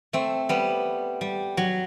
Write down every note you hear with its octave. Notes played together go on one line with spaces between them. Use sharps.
A3 C4
G3 B3
G3
F#3